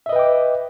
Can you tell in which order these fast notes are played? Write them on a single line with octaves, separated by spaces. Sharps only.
E5 D#5 B4 G5 D6